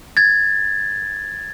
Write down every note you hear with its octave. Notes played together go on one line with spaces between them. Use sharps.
G#6 A6